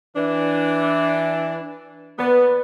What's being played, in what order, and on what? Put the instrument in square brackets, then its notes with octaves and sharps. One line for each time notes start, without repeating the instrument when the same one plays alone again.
[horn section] E3 D4
[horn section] B3 [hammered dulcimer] B4 D5